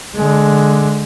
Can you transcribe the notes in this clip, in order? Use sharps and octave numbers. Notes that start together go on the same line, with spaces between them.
D3 G#3